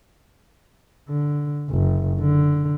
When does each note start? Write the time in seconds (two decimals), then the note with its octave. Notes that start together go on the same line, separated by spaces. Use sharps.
1.09 D3
1.70 F#1
2.21 D3